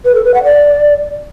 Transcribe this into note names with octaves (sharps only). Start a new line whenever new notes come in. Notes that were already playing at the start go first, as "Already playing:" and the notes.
B4
A4
B4
F#5
D5